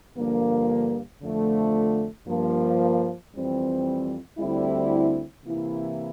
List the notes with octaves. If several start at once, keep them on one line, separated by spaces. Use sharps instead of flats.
G2 D3 F3 A#3
F2 D3 F3 A3
G2 F3 A#3
F2 E3 G3 C4
D2 D3 G3 C4 E4
C3 E3 A#3 E4